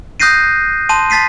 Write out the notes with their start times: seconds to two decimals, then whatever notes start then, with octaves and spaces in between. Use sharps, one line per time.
0.20 D#6 F#6 G6 A#6 C7 D#7
0.89 A5 C6 D#7
1.10 A5 A6 B6 C7 D#7